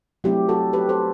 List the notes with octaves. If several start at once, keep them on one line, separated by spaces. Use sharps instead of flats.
F#3 A3 C4 E4 G4
F#4 A4
G4 B4
A4 C5